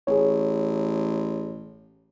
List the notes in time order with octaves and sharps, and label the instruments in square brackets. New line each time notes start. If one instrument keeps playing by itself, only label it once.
[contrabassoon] A1 [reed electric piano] G#4 C#5